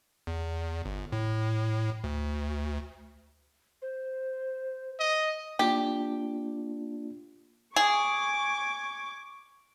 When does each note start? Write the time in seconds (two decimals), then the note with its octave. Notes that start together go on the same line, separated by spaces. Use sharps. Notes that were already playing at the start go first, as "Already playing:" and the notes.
0.27 E2
0.85 G1
1.12 A2
2.04 D2
3.82 C5
4.99 D#5
5.59 A#3 D4 F4 G4
7.76 G#4 C#6 D6 G#6